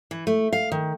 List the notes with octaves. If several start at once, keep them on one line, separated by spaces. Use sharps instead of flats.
E3
A3
F5
D#3